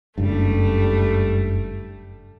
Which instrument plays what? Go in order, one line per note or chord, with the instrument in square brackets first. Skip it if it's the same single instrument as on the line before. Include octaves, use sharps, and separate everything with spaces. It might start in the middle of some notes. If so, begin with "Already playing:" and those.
[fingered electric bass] F#1 G2 [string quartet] G3 A3